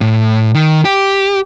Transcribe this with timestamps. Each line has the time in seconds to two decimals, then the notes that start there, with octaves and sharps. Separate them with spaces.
0.01 A2
0.55 D#3
0.85 G4